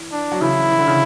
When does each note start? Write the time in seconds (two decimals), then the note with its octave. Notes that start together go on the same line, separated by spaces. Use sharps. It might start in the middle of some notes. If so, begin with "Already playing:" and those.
Already playing: E3
0.12 D4
0.32 F#3
0.41 C#3 E3 E4
0.71 E3
0.79 D3
0.87 C#3 E3